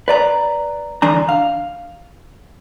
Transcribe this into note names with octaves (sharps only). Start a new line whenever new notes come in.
B4 D5 A#5
D3 E3 D4 A#5
F5